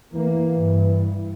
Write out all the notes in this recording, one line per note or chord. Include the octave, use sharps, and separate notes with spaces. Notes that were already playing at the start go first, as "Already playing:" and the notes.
E3 A#3
G2